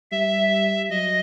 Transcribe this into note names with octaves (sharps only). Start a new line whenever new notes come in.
G3 E5
F#3 D#5